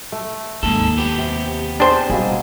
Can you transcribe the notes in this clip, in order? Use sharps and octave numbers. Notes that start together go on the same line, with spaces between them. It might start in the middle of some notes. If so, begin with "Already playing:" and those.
A3
D#2 G#2 A4
B3 G4
C3
C4 D4 G#4 C5
B2 G3 A#3 G#4